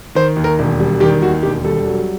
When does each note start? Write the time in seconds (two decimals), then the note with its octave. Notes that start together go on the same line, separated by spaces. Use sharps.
0.15 D#3 C5
0.36 D#2
0.44 A#4
0.59 E1
0.80 G3
1.00 D#3 G4
1.22 D#2 F#4
1.43 E1 G4
1.65 G3 A4
1.87 F#3